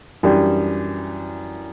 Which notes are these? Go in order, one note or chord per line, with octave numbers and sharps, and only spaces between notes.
F#2 E3 G3 D4 G4